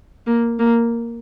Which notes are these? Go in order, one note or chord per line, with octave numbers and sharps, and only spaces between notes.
A#3
A#3